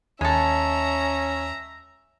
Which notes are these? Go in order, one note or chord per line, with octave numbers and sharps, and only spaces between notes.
D#2 G#3 C#4 A4 E5 A#5